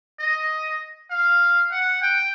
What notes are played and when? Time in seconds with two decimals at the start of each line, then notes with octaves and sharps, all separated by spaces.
0.20 D#5
1.10 F5
1.71 F#5
2.02 G5